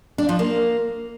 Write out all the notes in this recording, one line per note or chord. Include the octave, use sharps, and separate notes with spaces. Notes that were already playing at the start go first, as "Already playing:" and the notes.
D4
F3
A#3